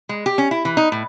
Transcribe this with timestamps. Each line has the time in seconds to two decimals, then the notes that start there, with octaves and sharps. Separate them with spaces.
0.09 G#3
0.26 G4
0.38 C#4
0.51 E4
0.65 E3
0.77 D#4
0.92 A2